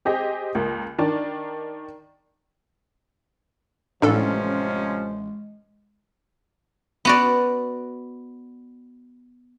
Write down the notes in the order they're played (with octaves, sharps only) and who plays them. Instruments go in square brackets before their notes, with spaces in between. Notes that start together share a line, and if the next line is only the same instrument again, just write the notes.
[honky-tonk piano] C4 G4 G#4 D#5 G5
C#2 A#3
D#3 D4 D5
[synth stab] A1 [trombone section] C3 F3 C#4 [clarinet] G#3 [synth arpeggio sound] D4 A4
[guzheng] B3 F#4 D5